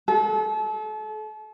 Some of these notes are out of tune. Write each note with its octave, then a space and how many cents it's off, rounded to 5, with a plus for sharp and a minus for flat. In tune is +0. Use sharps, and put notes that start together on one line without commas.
A4 -35